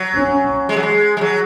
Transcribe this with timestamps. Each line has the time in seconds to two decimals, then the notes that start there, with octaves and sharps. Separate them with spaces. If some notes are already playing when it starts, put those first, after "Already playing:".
Already playing: F#3
0.17 C#4
0.69 G#3
0.77 F#3
0.83 G#3
1.17 G#3
1.21 F#3